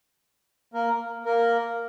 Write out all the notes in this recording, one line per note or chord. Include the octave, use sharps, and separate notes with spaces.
A#3 A#4
A#3 A#4